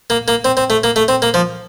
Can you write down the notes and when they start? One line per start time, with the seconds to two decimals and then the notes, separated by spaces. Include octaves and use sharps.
0.10 A#3
0.28 A#3
0.45 C4
0.57 C4
0.70 A3
0.84 A#3
0.96 A3
1.08 C4
1.22 A#3
1.34 F3